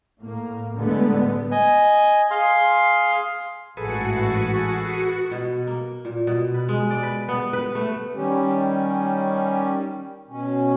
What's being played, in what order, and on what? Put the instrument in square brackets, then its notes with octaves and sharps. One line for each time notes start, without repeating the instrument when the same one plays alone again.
[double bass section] A2 A#3
A2 D3 G3 G#3 B3
[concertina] D#5 G#5
G#4 F5 C6
[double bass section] A1 G#2 E3 [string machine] F#4 C#7 [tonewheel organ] G#4 A4 B4
[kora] B2
A#3
A#2
B2
B4
G#3
D5
B4
B3
B4
A3
[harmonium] D#3 G3 C#4 G4
B2 C#4